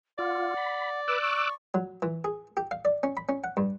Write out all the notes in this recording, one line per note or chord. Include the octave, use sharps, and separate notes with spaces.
F4 D5 F#5
B5
B4 D6 E6 F#6
C#6
F#3
E3
G#4
G4
F5
D5
C#4
B5
C#4
F#5
G2